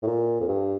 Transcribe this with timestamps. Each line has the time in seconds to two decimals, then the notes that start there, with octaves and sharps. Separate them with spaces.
0.03 A2
0.07 A#2
0.41 F2
0.48 G2